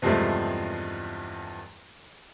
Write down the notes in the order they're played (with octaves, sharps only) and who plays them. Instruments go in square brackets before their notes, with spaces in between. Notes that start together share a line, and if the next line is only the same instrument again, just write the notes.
[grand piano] E2 G2 C3 F3 G#3 A3